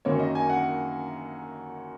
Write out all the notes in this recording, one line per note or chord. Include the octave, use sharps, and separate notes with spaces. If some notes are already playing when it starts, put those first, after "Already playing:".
F#2 D#3 A#3 C#4 C#5
D#5
G#5
F#5